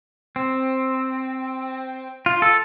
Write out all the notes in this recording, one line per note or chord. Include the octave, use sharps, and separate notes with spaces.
C4
F4
A4